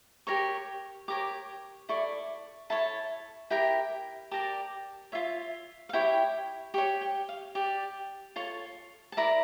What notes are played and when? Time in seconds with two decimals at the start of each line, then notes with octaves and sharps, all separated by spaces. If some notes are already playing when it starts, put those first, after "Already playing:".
0.27 G4 A#4 C#5 C#6
1.08 G4 A#4 C#5 D6
1.89 E4 A4 D5 C#6
2.70 E4 A4 C#5 A5
3.50 E4 G4 A#4 G5
4.31 G4 A#4 D5 A5
5.12 F4 C#5 E5
5.89 F5
5.93 E4 G4 C#5 G5
6.74 G4 C#6
6.78 C#5
7.01 G5
7.29 F5
7.55 G4 D5
8.36 F4 A4 C#5 C#6
9.12 A5
9.17 E4 A#4 D5 A#5